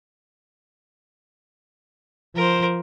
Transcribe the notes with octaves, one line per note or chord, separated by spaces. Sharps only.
F3 A#4 C5